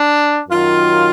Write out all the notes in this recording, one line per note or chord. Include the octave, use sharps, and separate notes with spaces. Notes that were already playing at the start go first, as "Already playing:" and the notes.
Already playing: D4
F#2 D#3 F#3 F4